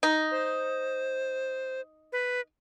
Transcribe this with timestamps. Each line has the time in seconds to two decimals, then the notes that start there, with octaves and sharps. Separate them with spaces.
0.03 D#4
0.31 C5
2.12 B4